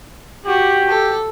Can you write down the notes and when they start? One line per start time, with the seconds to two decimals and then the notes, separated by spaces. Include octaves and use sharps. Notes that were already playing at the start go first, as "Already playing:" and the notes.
0.46 F#4 G4
0.89 A4